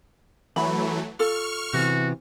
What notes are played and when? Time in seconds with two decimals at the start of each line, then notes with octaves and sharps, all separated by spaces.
0.56 E3 F#3 A3 B5
1.19 F4 A4 C#6 F6
1.74 C3 E3 B3 F#4